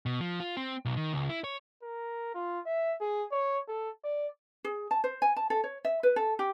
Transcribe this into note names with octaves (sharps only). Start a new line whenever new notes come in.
B2
F3
F4
C4
B1
D#3
C#2
E4
C#5
A#4
F4
E5
G#4
C#5
A4
D5
G#4
A5
C5
G#5
A5
A4
C#5
E5
B4
A4
G4